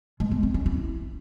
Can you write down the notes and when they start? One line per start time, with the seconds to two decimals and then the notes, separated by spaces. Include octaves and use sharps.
0.20 G#3
0.31 B3
0.43 C4
0.54 C#4
0.66 E4